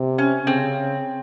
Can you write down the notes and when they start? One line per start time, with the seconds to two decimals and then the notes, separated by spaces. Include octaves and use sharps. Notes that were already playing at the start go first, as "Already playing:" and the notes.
Already playing: C3
0.18 C#4
0.47 C#3 C4